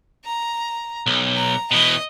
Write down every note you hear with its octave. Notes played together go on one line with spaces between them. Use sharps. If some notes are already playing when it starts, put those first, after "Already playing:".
A#5
B1
A#5
B2 E3 D#5